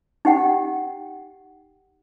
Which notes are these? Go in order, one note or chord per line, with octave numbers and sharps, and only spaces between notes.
D#4 G4 F#5 G5